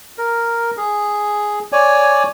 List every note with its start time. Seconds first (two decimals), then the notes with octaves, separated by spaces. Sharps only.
0.18 A#4
0.77 G#4
1.72 C#5 D5 G#5